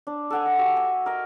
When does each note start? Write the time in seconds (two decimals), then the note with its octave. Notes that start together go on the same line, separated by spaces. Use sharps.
0.07 D4
0.30 A4 F#5 G#5
0.46 D#5
0.58 F#4 G4 E5
0.77 G#5
1.06 A#4 D#5